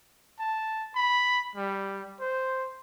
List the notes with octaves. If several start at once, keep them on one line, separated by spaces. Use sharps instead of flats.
A5
B5
G3
C5